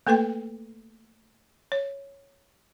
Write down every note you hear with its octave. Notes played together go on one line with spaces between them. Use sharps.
A3 A#3 A4 B4 G5
C#5